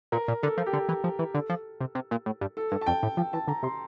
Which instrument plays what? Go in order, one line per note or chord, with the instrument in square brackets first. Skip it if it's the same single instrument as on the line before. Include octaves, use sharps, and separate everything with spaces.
[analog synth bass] A#2 [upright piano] A#4
[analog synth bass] A#2
[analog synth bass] D3 [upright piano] A4
[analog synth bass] F3
[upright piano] G4
[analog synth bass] D3 [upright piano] A4
[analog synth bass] E3
F3
E3
[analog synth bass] D3 [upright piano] A4
[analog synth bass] F3
C3
C3
A#2
A2
G2
[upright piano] A4
[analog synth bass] G2
[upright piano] A5
[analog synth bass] F2 [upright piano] G5
[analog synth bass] A2
[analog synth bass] F3 [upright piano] G5
[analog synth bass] E3 [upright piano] A5
[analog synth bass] D3 [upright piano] A#5
[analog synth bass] C3 [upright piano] C6